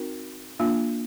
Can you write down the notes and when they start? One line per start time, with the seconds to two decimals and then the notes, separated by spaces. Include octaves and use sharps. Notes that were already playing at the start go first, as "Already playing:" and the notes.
Already playing: C4 D#4 F#4 A#4
0.59 A#3 D4 F4